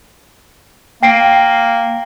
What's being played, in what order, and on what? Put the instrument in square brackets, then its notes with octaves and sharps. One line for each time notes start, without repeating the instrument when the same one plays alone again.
[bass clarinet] A#3 [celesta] G5 C7 D7